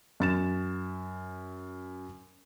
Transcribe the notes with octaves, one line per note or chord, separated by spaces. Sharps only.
F#2 A6 E7